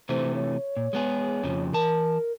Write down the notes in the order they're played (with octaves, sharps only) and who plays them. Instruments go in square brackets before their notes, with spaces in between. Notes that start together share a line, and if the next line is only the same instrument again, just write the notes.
[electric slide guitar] C3 E3 A3 [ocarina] C5
[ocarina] C#5
[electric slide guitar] A#2
G#3 B3 G#4
F2 C#3 F3
[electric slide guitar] E3 A5 [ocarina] A#4